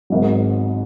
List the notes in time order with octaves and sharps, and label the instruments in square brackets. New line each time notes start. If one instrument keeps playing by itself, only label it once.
[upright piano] G#1 G#2 F#3